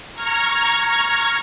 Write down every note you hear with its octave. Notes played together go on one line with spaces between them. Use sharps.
A#5 C#6 F6 G#6